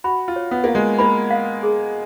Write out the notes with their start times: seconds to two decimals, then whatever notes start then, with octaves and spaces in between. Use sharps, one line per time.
0.04 F#4 B5
0.28 F4
0.36 C#5
0.51 B3
0.64 A#3 F5
0.75 G#3
0.98 A#3 B5
1.31 F5
1.63 G#4